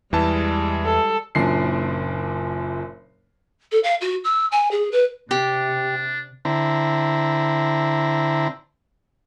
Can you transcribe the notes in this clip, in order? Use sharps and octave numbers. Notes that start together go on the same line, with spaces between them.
E2 E3 G3 G#3 A5
A4
F#1 F#2 A#2 D4 C7
A4
F5
F#4
E6
G#5
G#4
B4
C3 D4 G4
D3 C4 E4 A#5